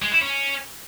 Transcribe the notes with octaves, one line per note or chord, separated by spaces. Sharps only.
G#3
E4
C#4